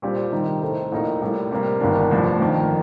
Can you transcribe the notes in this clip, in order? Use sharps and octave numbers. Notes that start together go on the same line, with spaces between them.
A#2 G3 D4 G4 C5
C3 D#3 G3 C4 D#4
A2 A3 D#4 A4 C5
A#1 A2 A3 D#4 A#4
A2 G3 A#3
C3 G3 A#3
G1 G2 D#3 A#3 D4
A1 G2 F3
F2 D#3 A#3